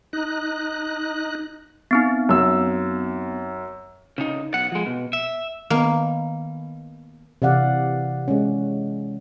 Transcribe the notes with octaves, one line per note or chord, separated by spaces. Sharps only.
D#4 F#6
B3 C4 D#4
F#2 E6
C#3 D#4
B1 F#5
F3 G#3
B2
E5
D#3 A#3 B3
C3 E3 D5 F5 F#5
G#3 C#4